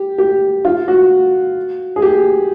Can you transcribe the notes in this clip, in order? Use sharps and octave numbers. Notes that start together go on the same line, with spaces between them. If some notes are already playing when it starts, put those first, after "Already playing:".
Already playing: G4
G4
F4
F#4
G#4
G4